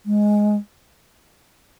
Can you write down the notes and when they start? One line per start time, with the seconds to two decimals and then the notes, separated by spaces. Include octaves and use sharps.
0.06 G#3